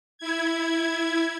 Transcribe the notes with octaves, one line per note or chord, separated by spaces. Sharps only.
E4 G#6